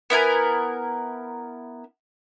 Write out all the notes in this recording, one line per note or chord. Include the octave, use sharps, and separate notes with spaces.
B3 E4 A#4 G#5